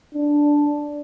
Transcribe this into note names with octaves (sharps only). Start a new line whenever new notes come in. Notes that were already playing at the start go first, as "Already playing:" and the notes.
D4